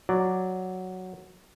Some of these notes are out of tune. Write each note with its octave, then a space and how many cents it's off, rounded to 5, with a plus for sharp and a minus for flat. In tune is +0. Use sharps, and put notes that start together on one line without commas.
F#3 +0 D5 +0